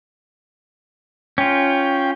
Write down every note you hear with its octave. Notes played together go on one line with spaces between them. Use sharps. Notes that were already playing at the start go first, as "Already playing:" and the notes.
C#4 F4 G5